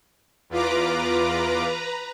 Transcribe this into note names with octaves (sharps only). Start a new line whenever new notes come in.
E2 F4 B4 A#5 D6